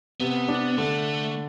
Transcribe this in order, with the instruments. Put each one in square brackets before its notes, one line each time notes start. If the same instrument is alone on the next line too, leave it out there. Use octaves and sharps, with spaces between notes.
[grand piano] C3 [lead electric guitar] B3
[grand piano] D4
[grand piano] D3 [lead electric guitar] A3